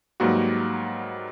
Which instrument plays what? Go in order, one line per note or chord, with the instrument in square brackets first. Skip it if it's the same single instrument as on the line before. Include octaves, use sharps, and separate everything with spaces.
[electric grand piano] G#2 F#3 G3 A#3 B3 F#4